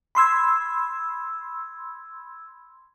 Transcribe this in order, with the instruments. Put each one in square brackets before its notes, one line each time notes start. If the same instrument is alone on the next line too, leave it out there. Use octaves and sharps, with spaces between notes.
[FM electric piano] B5 C6 E6 G#6